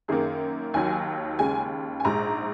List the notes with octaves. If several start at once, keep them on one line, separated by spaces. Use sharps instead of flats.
F#2 D#3 A#3 G#4
D#2 D#3 F#3 G#5
D#2 C#3 G#3 G#5
G#5
A#1 G#2 G#3 A#5